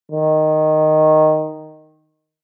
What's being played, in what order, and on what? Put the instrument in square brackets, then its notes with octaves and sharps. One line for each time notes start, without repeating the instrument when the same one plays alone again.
[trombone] D#3